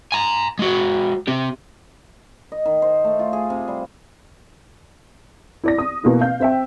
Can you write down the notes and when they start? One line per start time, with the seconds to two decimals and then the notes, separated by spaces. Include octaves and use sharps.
0.12 G#5 A#5
0.59 G#3 F#4
1.28 C4 G4
2.52 D#5
2.65 D#3
2.82 C5
3.05 A3
3.19 F4
3.33 G#4
3.50 C3
3.68 G3
5.64 E4 D5 A#6
5.78 D#6
6.03 B2 A#3 E4
6.21 F5 G6
6.40 C4 E5 G5